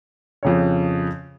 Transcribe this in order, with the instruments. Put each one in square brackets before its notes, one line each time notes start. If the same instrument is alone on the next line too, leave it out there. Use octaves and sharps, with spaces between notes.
[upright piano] F2 C#3 C#5